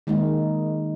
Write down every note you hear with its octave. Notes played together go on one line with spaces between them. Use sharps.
D#3 G#3 A#3 D#4